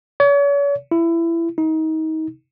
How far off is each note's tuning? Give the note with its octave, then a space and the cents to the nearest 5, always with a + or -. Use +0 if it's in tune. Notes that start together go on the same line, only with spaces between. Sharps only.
C#5 +40
E4 +20
D#4 +30